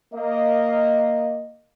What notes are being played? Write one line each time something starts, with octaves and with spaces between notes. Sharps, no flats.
A#3 D#5